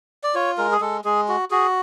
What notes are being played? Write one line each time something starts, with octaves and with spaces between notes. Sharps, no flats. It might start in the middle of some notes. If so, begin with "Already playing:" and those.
D5
F4 C#5
G#3 A#4
G#4
G#3 A4
G#3 G#4
F#4
F#4 G#4